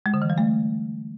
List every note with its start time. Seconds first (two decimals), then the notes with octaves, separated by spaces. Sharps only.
0.06 G#3
0.14 D3
0.22 E3
0.30 G3
0.38 A3